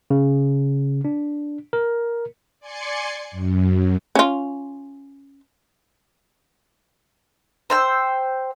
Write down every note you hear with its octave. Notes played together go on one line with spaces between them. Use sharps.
C#3
D4
A#4
D5 G#5 C6 C#7
F#2
C#4 F4
C5 G5 E6